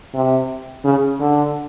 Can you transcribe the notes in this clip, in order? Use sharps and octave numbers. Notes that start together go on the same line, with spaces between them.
C3
C#3
D3